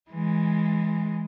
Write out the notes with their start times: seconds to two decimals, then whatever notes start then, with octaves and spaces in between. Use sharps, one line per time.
0.11 E3 G#3